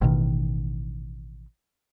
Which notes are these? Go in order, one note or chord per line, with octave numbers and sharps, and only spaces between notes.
A1 B2 D#3